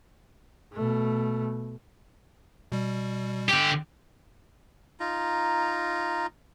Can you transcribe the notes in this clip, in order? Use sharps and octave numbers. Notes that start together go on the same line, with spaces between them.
B2 A3
B2 G3
D3 G4
D#4 F4 A#5